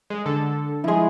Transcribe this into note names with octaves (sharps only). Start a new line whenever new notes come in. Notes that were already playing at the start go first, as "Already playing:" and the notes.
G#3
D3 A4
F3 G#3 E4 G#4